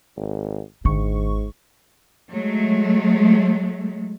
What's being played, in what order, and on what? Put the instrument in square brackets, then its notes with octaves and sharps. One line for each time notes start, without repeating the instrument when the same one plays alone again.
[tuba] G#1
[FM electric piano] G#1 C#6 [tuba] G#2 [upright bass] D3
[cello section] F#3 G#3 A3